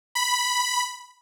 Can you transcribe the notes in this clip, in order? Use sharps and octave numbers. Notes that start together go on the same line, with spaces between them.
B5